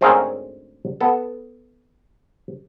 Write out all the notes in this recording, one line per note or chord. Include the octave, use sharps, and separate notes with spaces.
D2 G#2 C4 C#4 G#4 A#4
B3 A4